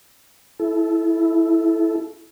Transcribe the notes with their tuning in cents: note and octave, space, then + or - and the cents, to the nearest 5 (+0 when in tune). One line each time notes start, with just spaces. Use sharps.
E4 +0 A4 -25